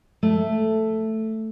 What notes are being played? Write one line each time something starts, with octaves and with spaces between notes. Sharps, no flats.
A3